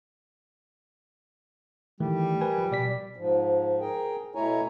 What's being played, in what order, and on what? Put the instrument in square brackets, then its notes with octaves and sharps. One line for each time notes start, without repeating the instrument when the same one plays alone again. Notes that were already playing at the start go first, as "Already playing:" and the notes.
[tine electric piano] D#3 E3 A3 [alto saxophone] G3
[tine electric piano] A#4 B4 G#5
F3
B2 D5 B6
[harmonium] G#2 F3
G#4 A#4 G5
B2 A3 E4 C#5 G#5 A#5